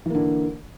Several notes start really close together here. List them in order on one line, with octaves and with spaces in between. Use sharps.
E3 A#3 D3